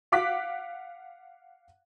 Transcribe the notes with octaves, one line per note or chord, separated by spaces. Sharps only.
F5 F#5 D6 F#6 B6